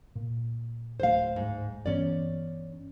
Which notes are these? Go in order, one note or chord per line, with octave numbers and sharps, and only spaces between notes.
A#2
D1 A3 C5 F5
G#2
G2 E3 B3 C#4 D5